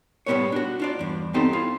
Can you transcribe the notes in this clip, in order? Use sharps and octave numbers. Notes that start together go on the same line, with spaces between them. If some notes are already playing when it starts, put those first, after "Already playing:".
A2 G3 A#3 B3 C5 C#5
D4 F#4
D4 F4 D5
E2 G2
B3 C4 D#4 G4 A4 C5
E4 F4